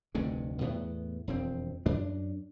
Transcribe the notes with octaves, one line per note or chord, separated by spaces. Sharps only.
F1 D2 G2 C3
E2 A2 B3
E1 F2 C4
F#2 D4